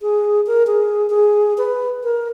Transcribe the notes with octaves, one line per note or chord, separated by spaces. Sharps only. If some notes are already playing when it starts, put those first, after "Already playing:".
G#4
A#4
G#4
G#4
B4
A#4